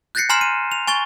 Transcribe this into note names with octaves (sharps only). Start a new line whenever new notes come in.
F#6 G6 A6 A#6 C7 C#7
G#5 A#5 C6 F6 C7 E7
D#7
F7
G#5 C#6 A6 G7